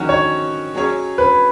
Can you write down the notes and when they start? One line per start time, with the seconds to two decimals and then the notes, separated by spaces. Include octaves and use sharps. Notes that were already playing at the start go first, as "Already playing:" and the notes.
Already playing: D#3 F#3 C#4 F#4
0.09 C#5
0.74 F#3 C#4 G#4 C#5
1.18 B4